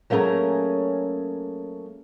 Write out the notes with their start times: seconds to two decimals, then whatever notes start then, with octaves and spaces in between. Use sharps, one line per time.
0.10 F#3 A3 A#3 C#4 G#4 A#5